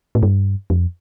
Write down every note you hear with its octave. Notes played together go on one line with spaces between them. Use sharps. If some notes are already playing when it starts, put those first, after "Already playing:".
A2
G2
F2